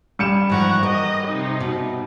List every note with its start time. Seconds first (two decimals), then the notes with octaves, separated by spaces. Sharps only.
0.19 G3 C#7 E7
0.49 G#2 E3 F3 F#5 A#5 C#6
0.83 A#4 D#5
1.26 C3 D#4
1.60 B2